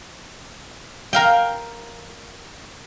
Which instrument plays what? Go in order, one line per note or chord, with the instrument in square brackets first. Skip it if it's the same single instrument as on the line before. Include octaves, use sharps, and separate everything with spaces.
[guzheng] A#4 F5 G5